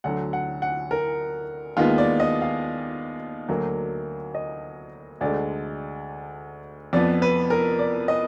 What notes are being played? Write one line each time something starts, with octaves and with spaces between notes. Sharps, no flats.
D2 D3 F#3 F#5
F#5
F#5
A#4
D#2 D#3 G#3 B3 F4
D5
D#5
F5
D2 D3 F#3 A#3
D#5
D2 D3 G#3 D5
F2 F3 B3 D5
B4
A#4
D5
D#5